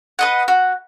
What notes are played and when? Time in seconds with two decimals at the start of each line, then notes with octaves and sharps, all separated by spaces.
0.19 B4 D#5 F#5
0.48 F#4